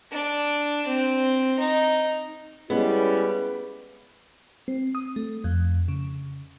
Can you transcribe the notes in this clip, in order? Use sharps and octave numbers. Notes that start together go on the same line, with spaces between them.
D4
C4
D#4
G3 G#3 B3 C#4 E4
C4
D#6
A3
F2
C#3